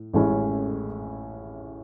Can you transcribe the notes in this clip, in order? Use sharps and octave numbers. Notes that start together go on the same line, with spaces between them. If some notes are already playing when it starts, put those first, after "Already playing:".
Already playing: A2
A1 A2 G#3 C#4 E4